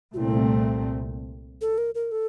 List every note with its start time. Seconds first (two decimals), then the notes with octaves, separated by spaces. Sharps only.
0.14 C2 A#2 A3 C4 E4 F#4
1.61 A4
1.78 A#4
1.95 A#4
2.12 A4